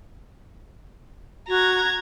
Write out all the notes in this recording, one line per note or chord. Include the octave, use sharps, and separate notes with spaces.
F#4 A#5 G#6